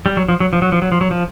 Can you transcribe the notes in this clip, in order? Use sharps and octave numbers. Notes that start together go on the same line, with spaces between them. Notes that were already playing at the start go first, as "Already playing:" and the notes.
G3
F#3
F3
F#3
F3
F#3
F3
F#3
F3
F#3
F3